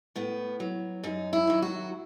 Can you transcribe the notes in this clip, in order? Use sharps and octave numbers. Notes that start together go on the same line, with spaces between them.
A2 B3
F#3
F#2 D#4
E4
D#3 F#3
F#4